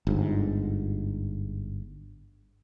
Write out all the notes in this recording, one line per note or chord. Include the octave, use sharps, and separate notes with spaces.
G1 G#2